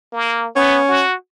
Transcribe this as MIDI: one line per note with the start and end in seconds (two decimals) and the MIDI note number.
0.13 0.47 58
0.56 0.80 59
0.56 1.03 61
0.89 1.15 66